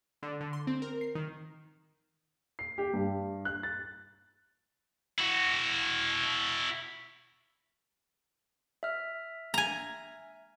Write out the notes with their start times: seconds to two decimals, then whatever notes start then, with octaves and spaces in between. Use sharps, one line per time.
0.23 D3
0.41 D3
0.53 C6
0.67 C4
0.82 A#4
1.01 C7
1.15 D#3
2.59 C7
2.78 G4
2.93 G2
3.45 F#6
3.63 A6
5.18 E4 F#4
8.83 E5 F6
9.54 G#5 A#5